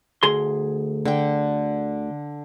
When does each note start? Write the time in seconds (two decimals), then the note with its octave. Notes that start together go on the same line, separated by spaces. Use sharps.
0.23 D2 G#4 C6
1.05 D3 G5